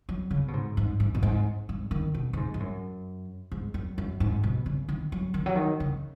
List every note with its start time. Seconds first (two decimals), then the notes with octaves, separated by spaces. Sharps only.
0.09 F#3
0.31 C#3
0.48 B2
0.53 G#2
0.77 G#2
1.00 G#2
1.14 B2
1.23 G#2
1.69 G#2
1.91 D#3
2.15 B2
2.33 B2
2.37 G#2
2.54 G#2
2.60 F#2
3.52 G#2
3.74 F#2
3.98 F#2
4.20 G#2
4.43 B2
4.66 C#3
4.89 D#3
5.12 F#3
5.34 D#3
5.46 F#3
5.55 D#3
5.80 C#3